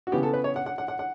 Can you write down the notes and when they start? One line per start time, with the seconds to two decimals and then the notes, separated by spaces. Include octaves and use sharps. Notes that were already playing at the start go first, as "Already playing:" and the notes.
0.07 F#4
0.12 C#3 E3 B3 G4
0.23 A4
0.33 B4
0.44 C#5
0.56 F#5
0.66 F#5
0.78 F#5
0.88 F#5
0.99 F#5